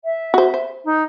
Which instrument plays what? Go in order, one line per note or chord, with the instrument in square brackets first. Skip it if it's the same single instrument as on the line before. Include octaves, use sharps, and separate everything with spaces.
[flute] E5
[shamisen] F#4 C5
C5
[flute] D#4